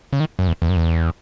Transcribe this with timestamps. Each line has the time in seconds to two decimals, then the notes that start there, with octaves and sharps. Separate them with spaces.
0.13 C#3
0.20 D#3
0.39 F#2
0.48 E2
0.62 E2
0.69 F#2
0.76 E2